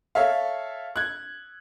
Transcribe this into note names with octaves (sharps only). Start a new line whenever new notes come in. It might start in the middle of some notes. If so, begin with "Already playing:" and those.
A4 C#5 E5 F5
F#6 G#6